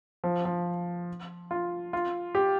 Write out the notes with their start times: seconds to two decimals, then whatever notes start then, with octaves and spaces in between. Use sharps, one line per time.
0.24 F3
0.45 F3
1.51 F4
1.93 F4
2.35 G4